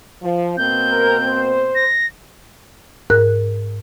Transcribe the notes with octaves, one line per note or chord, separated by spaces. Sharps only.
F3
B2 A#3 C4 G6
A#4
C5
A#6
G#2 A#4 F#6